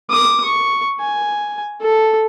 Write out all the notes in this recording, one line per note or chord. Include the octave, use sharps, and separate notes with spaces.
D6 D#6
C#6
G#5
A4